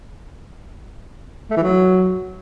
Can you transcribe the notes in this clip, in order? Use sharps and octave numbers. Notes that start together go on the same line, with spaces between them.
A3
E3
F#3